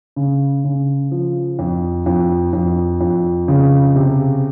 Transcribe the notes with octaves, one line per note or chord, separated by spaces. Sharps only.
C#3
C#3
F3
F2
F2
F2
F2
C#3
C3